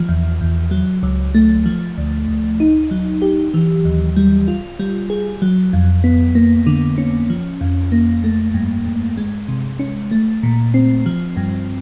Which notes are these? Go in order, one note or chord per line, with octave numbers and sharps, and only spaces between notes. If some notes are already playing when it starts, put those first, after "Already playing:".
Already playing: F3
E2
E2
F#3
C#2
A3
F3
D2
D2
D#4
F#3
G4
E3
D#2
G3
F4
G3
G#4
F#3
F2
B3
A#3
D3
C#4
F3
F2
A#3
A3
G2
G2
G#3
C3
C#4
A3
A#2
C4
F3
G2